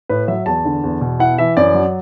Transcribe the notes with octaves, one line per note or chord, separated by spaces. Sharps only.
A2 B4
F#3 E5
E2 A5
D3
E2
B2
E4 F#5
E3 E5
F#2 D5
F#3